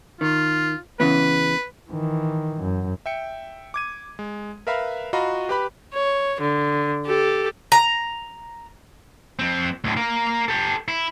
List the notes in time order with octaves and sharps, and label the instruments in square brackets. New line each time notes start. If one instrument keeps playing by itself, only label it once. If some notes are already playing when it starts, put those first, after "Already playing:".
[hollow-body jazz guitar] D#3 [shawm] F4
[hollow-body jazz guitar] C#3 E3 B3 [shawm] B4
[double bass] D#3 E3
F#2
[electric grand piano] E5 G5 C#7
D6 G#6 D#7
G#3
A#4 B4 E5 F5 A#5 B5
F4 F#4 D#5 F5 A#5 B5
G4 B4 B5
[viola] C#5
D3
G4 A4
[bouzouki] A#5
[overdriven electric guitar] F2 C4
D2 A2
A#4 F5
G4 A4
E4